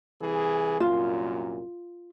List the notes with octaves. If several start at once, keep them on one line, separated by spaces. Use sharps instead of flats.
C2 E3 G#4
C2 F#2 A#2 F4